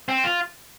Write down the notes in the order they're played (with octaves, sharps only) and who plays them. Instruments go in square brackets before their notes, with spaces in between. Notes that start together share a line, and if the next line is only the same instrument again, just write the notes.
[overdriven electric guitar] C4
F4